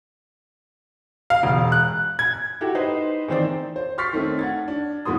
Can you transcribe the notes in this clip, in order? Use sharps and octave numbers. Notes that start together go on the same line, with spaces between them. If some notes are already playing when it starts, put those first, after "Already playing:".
F5
E1
F#6
G#6
E4 F#4 G4 A4
D#4 B4 C5
D#3 E3 C4 E4 C5 D5
C5
C6 C#6 F6 A6 B6 C7
D#3 A3 C4 C#4
F#5 G#6 A6
D4
D#2 A2 G3 B3 C6 D#6